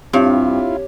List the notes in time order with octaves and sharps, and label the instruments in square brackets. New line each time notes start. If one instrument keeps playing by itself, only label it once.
[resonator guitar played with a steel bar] G2 [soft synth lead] C4 [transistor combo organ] E4 F4 [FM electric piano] G4 C#5